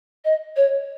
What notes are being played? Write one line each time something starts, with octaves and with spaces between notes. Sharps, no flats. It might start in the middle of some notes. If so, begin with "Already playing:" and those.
D#5
C#5